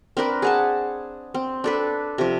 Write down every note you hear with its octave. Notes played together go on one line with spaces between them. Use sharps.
C4 D4 A#4 B4
G#4 F#5 A5
C4
D4 A4 B4
C3 F3